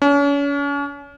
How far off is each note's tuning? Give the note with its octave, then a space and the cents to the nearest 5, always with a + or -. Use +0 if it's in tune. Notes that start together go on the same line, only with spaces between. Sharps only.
C#4 +40